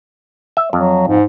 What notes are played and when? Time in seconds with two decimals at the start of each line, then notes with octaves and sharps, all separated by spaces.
0.57 E5
0.73 F2 F#3
1.08 G#2